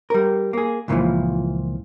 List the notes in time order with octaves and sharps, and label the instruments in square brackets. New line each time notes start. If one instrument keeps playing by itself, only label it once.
[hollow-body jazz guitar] G3 A#4
A#3 G#4
C#2 A#2 C#3 E3 F3